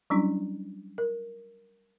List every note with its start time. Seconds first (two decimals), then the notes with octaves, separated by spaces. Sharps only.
0.10 F#3 G3 C#4 D4 E4
0.98 A#4